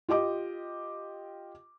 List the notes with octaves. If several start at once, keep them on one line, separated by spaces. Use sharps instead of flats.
F4 G4 D#5 D6